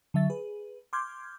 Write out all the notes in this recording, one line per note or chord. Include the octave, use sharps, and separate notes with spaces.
D3 F#3 E5 A6
G#4 B4
C6 D6 F6 G6 G#6